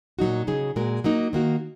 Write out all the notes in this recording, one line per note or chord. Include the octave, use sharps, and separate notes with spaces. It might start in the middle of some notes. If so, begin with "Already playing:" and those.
A#2 F#3 D#4 F#4
C#3 F#3 D#4 G#4
A#2 G#3 F#4 A#4
F#3 A#3 D#4
D#3 A#3 F#4